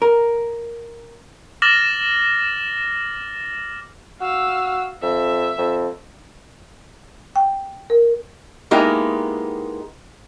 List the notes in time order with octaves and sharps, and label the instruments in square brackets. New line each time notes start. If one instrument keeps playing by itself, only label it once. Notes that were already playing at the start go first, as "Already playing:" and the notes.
[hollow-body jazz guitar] A#4
[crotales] D6 F6 A6 A#6 E7 F#7
[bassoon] F#4 [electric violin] F5 E6
[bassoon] F2 [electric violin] E5
[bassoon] F2
[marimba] G5
A#4
[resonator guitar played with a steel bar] G#3 A#3 B3 D#4 E4 G4